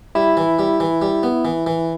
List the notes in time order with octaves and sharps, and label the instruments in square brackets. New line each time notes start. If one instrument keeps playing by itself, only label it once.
[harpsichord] G3 [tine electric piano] E4
[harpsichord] E3
G3
E3
G3
B3
E3
E3